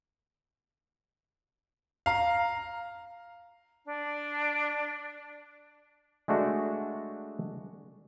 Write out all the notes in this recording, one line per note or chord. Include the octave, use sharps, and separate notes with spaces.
F5 A#5
D4
G#3 A3 D4 F#4